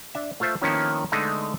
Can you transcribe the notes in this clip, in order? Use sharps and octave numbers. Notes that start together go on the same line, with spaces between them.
D4 E5
A3 F4 A4 C5 E5
D#3 F3 A#3 B3 C#4 E4
D3 G#3 A3 B3 D4 D#4